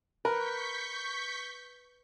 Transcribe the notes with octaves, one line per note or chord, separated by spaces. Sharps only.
A#4 B4 C#6 G6 B6